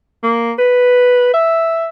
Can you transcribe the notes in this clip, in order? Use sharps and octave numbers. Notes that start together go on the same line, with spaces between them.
A#3
B4
E5